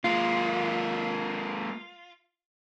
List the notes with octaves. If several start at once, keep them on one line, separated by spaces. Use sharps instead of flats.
G#3 A#3 F4